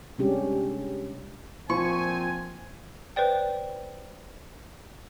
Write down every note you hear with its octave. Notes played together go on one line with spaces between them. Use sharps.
C3 G3 G#3 C#4 D4 G4
A#2 F3 C4 G#5 C#6
B4 C5 D5 G5